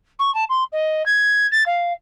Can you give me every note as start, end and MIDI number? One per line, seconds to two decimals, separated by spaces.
0.19 0.33 85
0.34 0.44 81
0.49 0.64 84
0.72 1.05 75
1.06 1.47 92
1.51 1.63 93
1.66 1.93 77